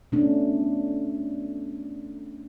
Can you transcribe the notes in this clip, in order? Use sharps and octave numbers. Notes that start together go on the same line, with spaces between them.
B2 A3 C#4 D4